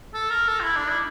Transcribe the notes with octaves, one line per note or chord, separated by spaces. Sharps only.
A4
A#4
A4
F4
E4
D4
E4